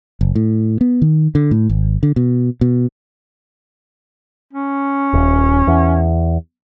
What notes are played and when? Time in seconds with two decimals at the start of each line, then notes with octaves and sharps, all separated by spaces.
0.21 F#1
0.35 A2
0.81 B3
1.02 D#3
1.35 D3
1.51 A2
1.70 G#1
2.03 D3
2.16 B2
2.61 B2
4.53 C#4
5.13 D#1
5.67 E2